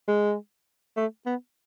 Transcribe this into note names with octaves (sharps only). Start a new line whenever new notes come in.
G#3
A3
B3